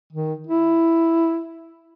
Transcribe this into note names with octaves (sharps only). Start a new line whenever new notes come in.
D#3
E4